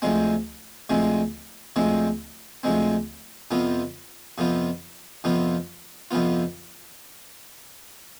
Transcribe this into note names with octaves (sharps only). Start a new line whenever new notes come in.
D2 C3 F3 G#3 C4
D2 C3 F3 G#3 C4
D2 C3 F3 G#3 C4
D2 C3 F3 G#3 C4
F2 C3 F3 B3 F4
F2 C3 F3 B3 F4
F2 C3 F3 B3 F4
F2 C3 F3 B3 F4